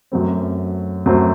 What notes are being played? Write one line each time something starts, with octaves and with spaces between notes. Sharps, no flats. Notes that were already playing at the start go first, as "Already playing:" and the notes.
F#2 F#3 A3 C4
F#2 F#3 A3 C4